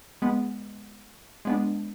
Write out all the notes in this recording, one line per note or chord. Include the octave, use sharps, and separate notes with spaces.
G#3 B3
G#3 B3 D4